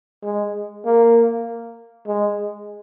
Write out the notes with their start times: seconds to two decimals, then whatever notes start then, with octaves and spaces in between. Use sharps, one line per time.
0.24 G#3
0.85 A#3
2.07 G#3